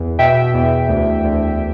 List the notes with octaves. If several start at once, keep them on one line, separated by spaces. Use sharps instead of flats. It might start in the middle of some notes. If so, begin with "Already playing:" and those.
Already playing: E2
B2 E5 G5
E2
D2
D2